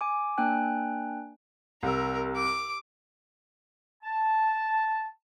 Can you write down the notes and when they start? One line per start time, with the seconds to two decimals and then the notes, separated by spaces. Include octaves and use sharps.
0.01 G#5 D6
0.38 A#3 D4 G5 G#5 F#6
1.83 C2 A#4 E6
2.36 D6
4.04 A5